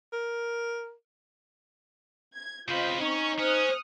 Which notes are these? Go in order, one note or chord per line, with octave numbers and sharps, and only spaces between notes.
A#4
G#6
C#3 C4 F4 B4 D#5 G6
C#4 D#4 C#6
C#4 C5 D#6 F6 F#6